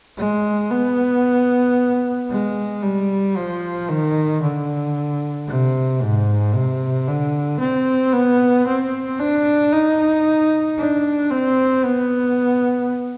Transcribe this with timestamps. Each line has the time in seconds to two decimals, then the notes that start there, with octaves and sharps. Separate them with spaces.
0.18 G#3
0.71 B3
2.30 G#3
2.83 G3
3.36 F3
3.88 D#3
4.42 D3
5.47 C3
6.02 G#2
6.54 C3
7.07 D3
7.59 C4
8.12 B3
8.67 C4
9.19 D4
9.73 D#4
10.78 D4
11.30 C4
11.84 B3